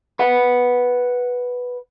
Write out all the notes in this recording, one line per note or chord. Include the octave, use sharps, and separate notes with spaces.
B4 F#5